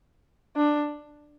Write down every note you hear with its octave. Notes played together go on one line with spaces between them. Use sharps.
D4